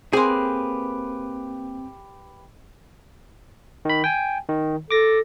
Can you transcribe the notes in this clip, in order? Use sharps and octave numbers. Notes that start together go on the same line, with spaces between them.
A#3 C4 G4 G#4 B4 G#5 C6
D#3 B5
G5 G#5
D#3
A4 D6 A#6